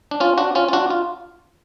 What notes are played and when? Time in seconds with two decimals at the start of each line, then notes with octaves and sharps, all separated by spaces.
0.11 D4
0.20 C#4 F4
0.38 D4 F#4
0.55 C#4 F4
0.69 F4
0.73 D4 F#4
0.90 F4